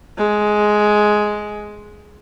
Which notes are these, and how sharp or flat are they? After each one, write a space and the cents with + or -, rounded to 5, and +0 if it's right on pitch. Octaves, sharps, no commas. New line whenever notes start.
G#3 +10